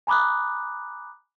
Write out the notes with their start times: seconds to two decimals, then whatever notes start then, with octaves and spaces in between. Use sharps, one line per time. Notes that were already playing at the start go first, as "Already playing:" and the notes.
0.07 G#5 A#5 B5 D6 D#6 F#6